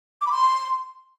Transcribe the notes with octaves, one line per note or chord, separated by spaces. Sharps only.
D6
B5
C6